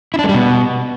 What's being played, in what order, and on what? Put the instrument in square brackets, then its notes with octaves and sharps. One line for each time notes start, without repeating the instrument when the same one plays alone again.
[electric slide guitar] E4
D4
G#3
G3
B2